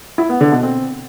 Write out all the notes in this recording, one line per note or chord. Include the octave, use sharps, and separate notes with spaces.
E4
B3
D3
B2
C4